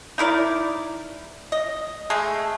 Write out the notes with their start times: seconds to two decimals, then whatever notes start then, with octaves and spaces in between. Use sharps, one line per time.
0.18 D#4 E4 A#4 D5
1.52 D#5
2.10 G#3 A3 G#4